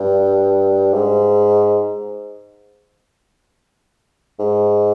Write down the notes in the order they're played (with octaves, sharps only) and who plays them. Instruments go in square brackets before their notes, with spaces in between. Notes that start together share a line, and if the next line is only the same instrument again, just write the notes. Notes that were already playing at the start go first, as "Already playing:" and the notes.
Already playing: [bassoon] G2
G#2
G#2